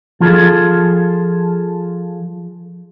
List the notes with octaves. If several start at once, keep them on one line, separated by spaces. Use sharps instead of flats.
F3 F4 G#4 A4